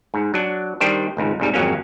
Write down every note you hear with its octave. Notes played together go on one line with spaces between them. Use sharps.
G#2
F#3 D4
D#3 G3 D4 G4 C5
G#1 C#2 G#2
C2 G#2 G3
G#1 F2 F#3 A#3 C#4